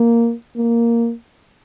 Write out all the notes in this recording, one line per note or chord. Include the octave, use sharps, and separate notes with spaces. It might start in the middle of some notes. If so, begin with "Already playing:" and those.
Already playing: A#3
A#3